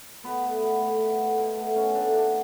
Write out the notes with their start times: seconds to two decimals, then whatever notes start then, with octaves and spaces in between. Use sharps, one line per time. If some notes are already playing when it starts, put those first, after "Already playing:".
0.24 B2 B3
0.43 A3
0.62 B2
0.80 A3
0.99 B2
1.19 A3
1.38 B2
1.57 A3
1.76 B2 C#4
1.95 A3 D4
2.14 B2 D4